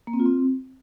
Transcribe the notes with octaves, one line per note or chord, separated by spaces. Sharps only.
A#3
C4
F4
C4